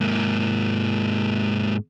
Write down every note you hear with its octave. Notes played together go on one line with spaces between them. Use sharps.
G#2 A#3